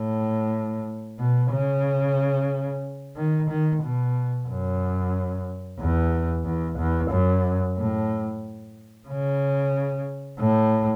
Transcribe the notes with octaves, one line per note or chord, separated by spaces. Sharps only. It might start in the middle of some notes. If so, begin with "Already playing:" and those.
Already playing: A2
B2
C#3
D#3
D#3
B2
F#2
E2
E2
E2
F#2
A2
C#3
A2